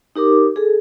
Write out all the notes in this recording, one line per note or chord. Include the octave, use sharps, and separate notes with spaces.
D#4 G4 A#4 D6
G#4 A4